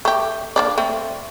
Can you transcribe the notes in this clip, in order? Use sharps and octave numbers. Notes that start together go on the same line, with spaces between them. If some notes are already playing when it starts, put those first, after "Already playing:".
A3 G4
A#3 D4 D5
A3 C4